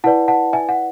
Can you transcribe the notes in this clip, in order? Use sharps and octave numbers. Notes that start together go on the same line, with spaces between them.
E4 B4 D5 F#5 A5
F#5 A5
E5 G#5
F#5